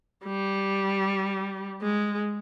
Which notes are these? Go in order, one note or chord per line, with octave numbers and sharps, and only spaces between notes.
G3
G#3